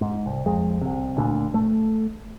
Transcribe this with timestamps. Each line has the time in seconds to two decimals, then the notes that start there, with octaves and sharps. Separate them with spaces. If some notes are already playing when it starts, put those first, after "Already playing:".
0.01 G#2
0.26 C2
0.46 F2 G#3
0.81 C2 C3
1.18 D2 A#2 D4
1.54 A3